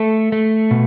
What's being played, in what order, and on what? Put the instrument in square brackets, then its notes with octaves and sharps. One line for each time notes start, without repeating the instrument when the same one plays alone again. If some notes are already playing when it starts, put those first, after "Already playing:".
Already playing: [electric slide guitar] A3 A4
A3
B2